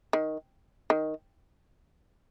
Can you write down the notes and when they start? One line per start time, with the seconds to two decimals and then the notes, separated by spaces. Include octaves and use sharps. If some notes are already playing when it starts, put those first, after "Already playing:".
0.13 D#3
0.90 D#3